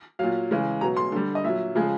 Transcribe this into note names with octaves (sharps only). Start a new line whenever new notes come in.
A#2 F#3 F5
C#3 E3 G#3
B2 F#3 A#5
C6
D3 G3
D#5
A#2 F#3 E5
C#3 F3 G#3